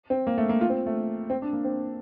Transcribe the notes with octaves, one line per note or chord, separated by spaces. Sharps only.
C4
A#3
A3
A#3
F4
C4
A3
C4
D4
A#3
C4